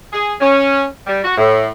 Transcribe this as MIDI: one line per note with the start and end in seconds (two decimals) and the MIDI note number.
0.13 0.35 68
0.41 0.85 61
1.07 1.20 55
1.24 1.33 66
1.37 1.68 45